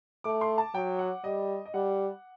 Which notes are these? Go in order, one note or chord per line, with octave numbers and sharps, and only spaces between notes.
A3 D6
C6
A5
F#3 G5
F#5
G3 D#5
D#5
G3 F#5